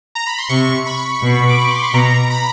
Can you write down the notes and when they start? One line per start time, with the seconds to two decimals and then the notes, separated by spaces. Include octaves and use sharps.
0.15 A#5
0.27 B5
0.38 C6
0.49 C3 C#6
0.86 B5
1.22 B2
1.49 D6
1.60 C#6
1.71 C6
1.83 B5
1.93 B2 A#5
2.22 A#5
2.30 B5